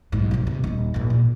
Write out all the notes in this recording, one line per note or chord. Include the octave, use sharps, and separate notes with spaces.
B1 G#2
F1 F3
C3
D#1 D#4
A#1 G#2
A#2